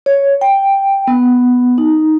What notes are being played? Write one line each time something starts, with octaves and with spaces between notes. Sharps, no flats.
C#5
G5
B3
D#4